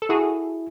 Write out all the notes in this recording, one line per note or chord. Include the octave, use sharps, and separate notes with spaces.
A4
E4 F#4 G#4